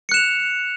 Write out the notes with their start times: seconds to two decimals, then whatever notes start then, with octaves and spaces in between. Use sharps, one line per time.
0.09 C#7
0.12 F#6
0.14 E7
0.17 F7